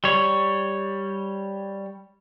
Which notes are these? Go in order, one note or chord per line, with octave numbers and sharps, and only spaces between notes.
G3 C#5